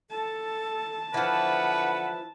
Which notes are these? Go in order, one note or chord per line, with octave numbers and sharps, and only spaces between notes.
A4 A5
D3 E3 F3 E4 B4 F#5